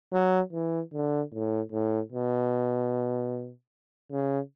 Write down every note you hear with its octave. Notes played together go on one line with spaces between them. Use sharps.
F#3
E3
D3
A2
A2
B2
C#3